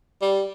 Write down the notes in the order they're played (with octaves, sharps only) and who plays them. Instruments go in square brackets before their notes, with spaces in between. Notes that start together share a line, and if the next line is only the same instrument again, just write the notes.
[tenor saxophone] G3